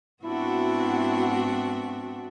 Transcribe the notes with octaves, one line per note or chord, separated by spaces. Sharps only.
G#2 B3 C4 D4 E4 F#4 E5